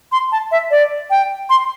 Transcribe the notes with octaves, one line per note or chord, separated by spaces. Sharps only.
C6
A5
E5
D5
G5
C6